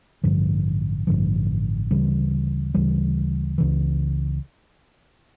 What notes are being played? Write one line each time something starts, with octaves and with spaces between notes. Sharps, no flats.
A1 G2 D3 F3
A1 G2 D3 F3
D2 C#3 E3 G3
D2 C#3 E3 G3
C#2 C#3 E3